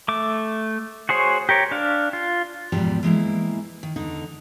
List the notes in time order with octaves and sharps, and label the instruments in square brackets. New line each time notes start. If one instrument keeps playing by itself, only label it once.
[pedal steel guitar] A3 D6
F#4 G#4 C5 C#5
G4 A#4 C#5
D4 F5
F4
[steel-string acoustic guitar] E2 G#2 B2 F3 G3 G5
E3 G#3 A#3 E4
D#3
E2 D3 D#4